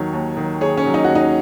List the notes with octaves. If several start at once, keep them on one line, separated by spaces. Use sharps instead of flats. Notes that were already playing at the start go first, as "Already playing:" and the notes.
Already playing: D#2 D#3 F#3 C#5
D#2
D#3 F#3
D#2 G#4 C#5
C#4
D#3 F#3
D#4
F#4
D#2
D#4